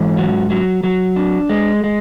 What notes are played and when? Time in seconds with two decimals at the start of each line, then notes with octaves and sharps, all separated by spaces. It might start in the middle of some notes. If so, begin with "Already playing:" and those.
Already playing: G#2 E3
0.17 F#3
0.50 F#3
0.84 F#3
1.16 D4
1.49 G#3
1.84 G#3